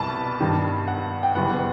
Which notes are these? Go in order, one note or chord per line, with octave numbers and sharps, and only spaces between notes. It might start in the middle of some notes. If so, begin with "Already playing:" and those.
Already playing: C2 B2 G3 A5 B5
G2 D#3 G3
F#5
G5
F#1 F#2 E3 G3 B3 F#5